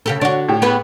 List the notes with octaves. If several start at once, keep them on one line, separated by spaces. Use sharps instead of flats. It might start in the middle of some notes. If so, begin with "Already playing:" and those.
C#3 G4 A4
D3 D4 F#4 C#5
A2 G4
B3 G#4 B4